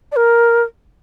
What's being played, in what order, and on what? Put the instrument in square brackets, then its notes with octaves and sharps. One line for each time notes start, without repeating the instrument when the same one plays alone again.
[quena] D5
A#4